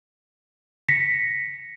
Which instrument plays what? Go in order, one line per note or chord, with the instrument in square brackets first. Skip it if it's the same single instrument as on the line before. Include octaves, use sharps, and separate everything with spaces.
[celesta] A#6 B6 C#7